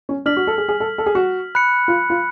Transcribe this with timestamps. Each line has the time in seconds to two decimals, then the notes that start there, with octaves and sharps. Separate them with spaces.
0.09 C#4
0.26 D4 F6 B6 F#7
0.37 F#4
0.47 A4
0.58 G#4
0.69 G#4
0.80 A4
0.98 A4
1.06 G#4
1.15 F#4
1.55 B5 F#6 C#7
1.88 F4
2.10 F4